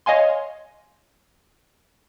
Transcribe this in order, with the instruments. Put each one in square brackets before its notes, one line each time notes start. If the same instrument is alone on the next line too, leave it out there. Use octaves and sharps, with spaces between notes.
[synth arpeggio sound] C#5 D#5 F5 G#5 C6